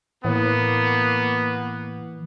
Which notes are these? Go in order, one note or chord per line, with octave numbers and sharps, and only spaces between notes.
A2 E3 A#3 B3